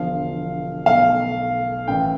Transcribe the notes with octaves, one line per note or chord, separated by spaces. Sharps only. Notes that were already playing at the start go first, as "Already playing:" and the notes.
Already playing: E1 E2 D3 F3 F5
B1 B2 A3 F5
A1 A2 E3 G5